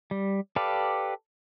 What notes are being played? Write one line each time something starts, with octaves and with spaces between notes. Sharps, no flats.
G3
G4 A4 B4 D5 F5